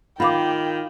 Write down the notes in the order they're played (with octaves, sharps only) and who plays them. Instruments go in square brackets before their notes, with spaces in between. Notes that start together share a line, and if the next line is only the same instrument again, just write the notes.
[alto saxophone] D#3 [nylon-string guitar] F4 F5 [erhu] G5 [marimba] B5 D6